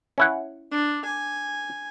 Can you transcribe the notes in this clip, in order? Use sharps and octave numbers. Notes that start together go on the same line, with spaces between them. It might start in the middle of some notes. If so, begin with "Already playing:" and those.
C#4 E4 F#5
D4
G#5